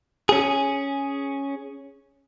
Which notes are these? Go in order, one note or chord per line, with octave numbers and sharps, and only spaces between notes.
C#4 G#4